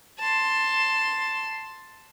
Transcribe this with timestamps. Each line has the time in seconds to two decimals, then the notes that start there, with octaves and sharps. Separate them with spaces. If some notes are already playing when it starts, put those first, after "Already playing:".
0.19 A5 C6